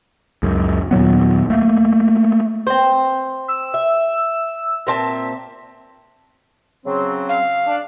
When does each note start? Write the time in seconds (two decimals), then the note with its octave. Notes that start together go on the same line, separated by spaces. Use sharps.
0.43 C#2 F#2
0.91 D#2 A#2 F#3 B3
1.50 A3 A#3
2.67 C4 C5
3.48 E6
3.74 E5
4.87 A#2 C4 E5 A5
6.86 C#3 F#3 C4
7.29 F5
7.67 D4